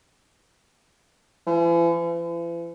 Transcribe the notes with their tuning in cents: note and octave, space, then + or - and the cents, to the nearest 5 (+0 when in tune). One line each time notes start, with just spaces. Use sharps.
E3 +45
E3 +45